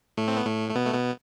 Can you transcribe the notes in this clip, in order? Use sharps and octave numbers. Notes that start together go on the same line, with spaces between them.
A2 A3
C4
B3
A2 A3
A3
B2 B3
A3
B2 B3